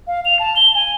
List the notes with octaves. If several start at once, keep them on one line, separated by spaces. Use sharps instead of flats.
F5
F7
A5
G7
G#5